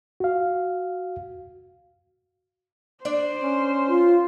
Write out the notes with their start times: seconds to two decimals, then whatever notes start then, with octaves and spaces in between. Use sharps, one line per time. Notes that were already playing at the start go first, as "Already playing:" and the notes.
0.20 F#4 F5
3.05 D4 C5 D5
3.43 C#4
3.89 F4